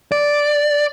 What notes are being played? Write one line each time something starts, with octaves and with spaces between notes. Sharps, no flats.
D5